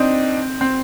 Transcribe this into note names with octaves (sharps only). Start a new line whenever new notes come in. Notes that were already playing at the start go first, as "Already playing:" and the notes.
Already playing: C4 D4 D#4
C4